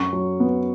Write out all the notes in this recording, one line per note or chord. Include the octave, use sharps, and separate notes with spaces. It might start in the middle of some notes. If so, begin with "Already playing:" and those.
Already playing: F#2 C#6
F#3
B3